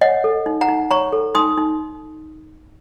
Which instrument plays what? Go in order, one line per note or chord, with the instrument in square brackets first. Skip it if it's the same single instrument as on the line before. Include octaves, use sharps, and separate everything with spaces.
[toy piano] C#5 D#5 F#5
A4
D#4
F#5 A#5
D#4
C#5 A#5 C#6
A4
D#4 C6 D#6
D#4